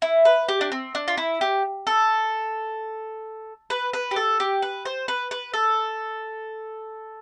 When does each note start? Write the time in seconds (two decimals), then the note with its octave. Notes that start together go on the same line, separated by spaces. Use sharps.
0.02 E4
0.25 B4
0.49 G4
0.61 D4
0.72 C4
0.95 D4
1.08 F4
1.17 E4
1.41 G4
1.87 A4
3.70 B4
3.93 B4
4.11 G4
4.16 A4
4.40 G4
4.62 B4
4.85 C5
5.08 B4
5.31 B4
5.53 A4